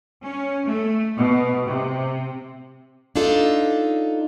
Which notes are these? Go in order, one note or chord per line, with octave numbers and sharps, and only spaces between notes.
C#4
A3
B2
C3
D4 D#4 F4 A4